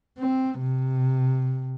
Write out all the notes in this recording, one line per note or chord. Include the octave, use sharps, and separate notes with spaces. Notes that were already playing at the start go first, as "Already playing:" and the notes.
C4
C3